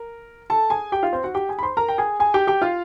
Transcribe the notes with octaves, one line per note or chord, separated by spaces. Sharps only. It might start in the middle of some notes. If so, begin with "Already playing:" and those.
Already playing: A#4
A4 A5
G#4 G#5
G4 G5
F4 F5
C4 C5
F#4 F#5
G4 G5
G#4 G#5
B5
C5 C6
A#4 A#5
G5
G#4 G#5
G#4 G#5
G4 G5
G4 G5
F4 F5